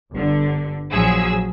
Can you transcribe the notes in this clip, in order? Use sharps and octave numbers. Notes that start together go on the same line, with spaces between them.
G1 D3
A#1 F3 F#3 G#4 E6